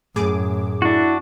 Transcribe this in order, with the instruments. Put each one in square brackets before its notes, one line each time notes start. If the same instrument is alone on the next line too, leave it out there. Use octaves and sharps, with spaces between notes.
[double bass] F#2 [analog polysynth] A2 G#4 D6
[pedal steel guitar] D4 F#4 [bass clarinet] E4